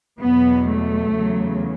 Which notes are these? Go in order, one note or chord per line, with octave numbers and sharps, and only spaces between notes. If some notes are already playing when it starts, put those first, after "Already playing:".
E2 B2 F#3 B3
A3
E2 C#3 F#3